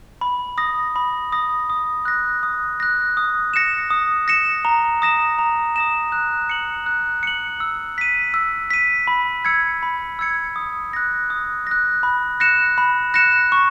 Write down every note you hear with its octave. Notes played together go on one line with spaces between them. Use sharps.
B5
D#6 A#6
B5
D#6 A#6
D#6
F#6 A#6
D#6
F#6 A#6
D#6
A#6 C#7 E7
D#6
A#6 C#7 E7
A#5
D#6 A#6 E7
A#5
D#6 A#6 E7
F#6
C#7 F#7
F#6
C#7 F#7
E6
B6 D#7
E6
B6 D#7
B5
E6 G#6 C#7
B5
E6 G#6 C#7
D#6
F#6 A#6
D#6
F#6 A#6
B5
F#6 A#6 C#7 E7
B5
F#6 A#6 C#7 E7
C#6